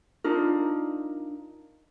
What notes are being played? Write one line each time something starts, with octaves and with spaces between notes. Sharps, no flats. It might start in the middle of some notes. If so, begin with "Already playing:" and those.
D4 D#4 F4 A#4